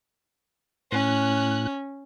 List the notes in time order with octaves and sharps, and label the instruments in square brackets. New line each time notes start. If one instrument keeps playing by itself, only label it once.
[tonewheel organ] A2 F#6 [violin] C#4